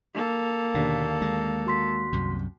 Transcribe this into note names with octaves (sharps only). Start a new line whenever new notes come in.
A#3 A4
D#2 B2 D3
G#3
F#4 C6 B6
C2 F#2 C3